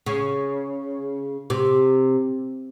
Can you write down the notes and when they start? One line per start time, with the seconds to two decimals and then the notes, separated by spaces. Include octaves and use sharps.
0.06 C#3
1.50 C3